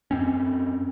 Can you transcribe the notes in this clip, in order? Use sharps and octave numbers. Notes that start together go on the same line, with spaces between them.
F#2 C4 C#4